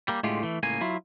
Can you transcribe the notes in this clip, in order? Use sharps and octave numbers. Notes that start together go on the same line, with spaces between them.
G3 A#3
A2 D3 G#3 A3 F4 G4
E3 A3
C#2 A2 A#3 G#5
F#3 E4 F4